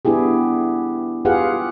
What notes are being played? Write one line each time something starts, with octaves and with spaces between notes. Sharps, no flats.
B3 D4 E4 G4 G#4
F4 G4 G#4 B4 F5 F#5